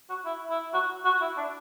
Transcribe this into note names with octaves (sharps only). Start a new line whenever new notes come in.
F#4
E4
E4
F#4
F#4
E4
D4